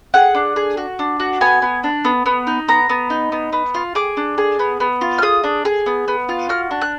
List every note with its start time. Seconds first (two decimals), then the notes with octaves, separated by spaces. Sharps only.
0.14 G#4 F#5
0.35 D4
0.56 G#4
0.77 F#4
0.99 D4
1.20 F#4
1.41 B3 G#5
1.62 B3
1.84 D4
2.05 B3
2.26 B3
2.47 D#4
2.68 B3 A#5
2.89 B3
3.10 D#4
3.32 B3
3.53 B3
3.75 F4
3.95 G#4 D6
4.17 D4
4.38 G#4
4.59 B3
4.80 B3
5.01 F4
5.18 F6
5.22 G#4 D#6
5.44 D4
5.65 G#4
5.86 B3
6.08 B3
6.29 F4
6.49 F#4 F6
6.71 D4
6.82 F#6